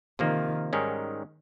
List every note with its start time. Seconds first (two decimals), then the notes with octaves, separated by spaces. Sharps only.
0.19 C3 D#3 F3 A#3
0.73 G#2 D#3 G3 C#4